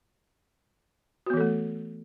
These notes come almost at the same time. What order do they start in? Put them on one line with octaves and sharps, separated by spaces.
F#4 B3 E3 A4 A3